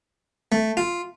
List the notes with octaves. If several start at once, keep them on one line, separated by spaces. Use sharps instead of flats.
A3
F4